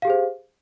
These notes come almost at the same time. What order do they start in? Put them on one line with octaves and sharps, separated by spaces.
F5 G4 G#4 C5